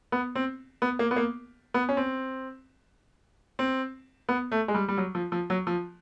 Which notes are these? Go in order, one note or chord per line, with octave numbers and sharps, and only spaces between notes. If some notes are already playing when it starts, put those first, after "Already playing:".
B3
C4
B3
A#3
B3
A#3
B3
C#4
C4
C4
B3
A3
G#3
G3
G3
F#3
F3
F3
F#3
F3